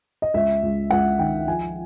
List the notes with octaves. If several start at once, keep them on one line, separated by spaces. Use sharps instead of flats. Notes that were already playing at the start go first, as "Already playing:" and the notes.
D#5
C#2 E5
C#2
C#2 F#5
D#3 G5
F3 G#5